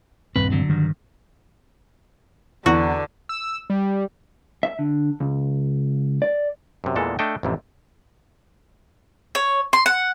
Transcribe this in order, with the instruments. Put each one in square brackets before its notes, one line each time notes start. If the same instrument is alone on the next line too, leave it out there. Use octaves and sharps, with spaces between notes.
[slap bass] D#1 G2 C4 [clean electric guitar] B4
[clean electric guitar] D3 F#3
[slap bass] G2 D#3
[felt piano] E2 [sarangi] D3 [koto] F#4
[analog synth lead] E6
G3
[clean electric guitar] E5
D3
C#2
D5
[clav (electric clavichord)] F#2 C3
E2 A#2 E3 G#3 A4
A3 D4 A4 D#5 G5
A1 F2 C3
[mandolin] C#5
C6
F#5